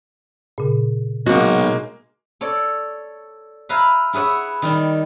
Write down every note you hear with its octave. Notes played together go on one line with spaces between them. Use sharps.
A#2 C#3
B1 G#3 A#3 F#4
A4 C#5 D5
B4 E5 F5 G#5 A#5 B5
E4 G#4 B4 C#5 F#5
D#3 G3